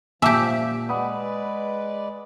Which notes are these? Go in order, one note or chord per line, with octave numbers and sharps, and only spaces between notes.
A#2 F3 G4 E5 G#5 A5 D6
G#3 B4 D5 F#5 B5 D#6